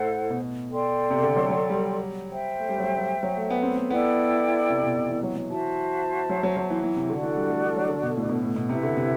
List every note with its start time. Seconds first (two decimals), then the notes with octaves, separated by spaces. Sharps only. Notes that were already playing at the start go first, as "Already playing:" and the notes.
Already playing: A2 E4 A4 C5 F#5
0.30 B2
0.70 A4 D5 G5 C6
1.10 C3
1.23 D3
1.36 F#3
1.49 F#3
1.70 G3
2.30 C5 E5 G5
2.59 A3
2.69 G3
2.78 F#3
2.84 G3
2.96 F#3
3.23 F#3
3.37 A3
3.50 B3
3.63 C4
3.77 B3
3.89 B3 E4 A4 D5 G5
4.70 C3
4.83 B2
4.96 B2
5.09 E3
5.23 F#3
5.36 F#3
5.50 E3 F#4 C5 E5 A5
6.30 F#3
6.43 F#3
6.57 F#3
6.70 E3
6.83 E3
6.96 C3
7.09 D3 D4 F#4 A4
7.23 E3
7.36 G3
7.50 A3
7.64 A3
7.76 F#3
7.89 D3
8.03 B2
8.16 A2
8.29 B2
8.43 A2
8.56 B2
8.69 C3 E4 B4 E5
8.83 D3
8.97 C3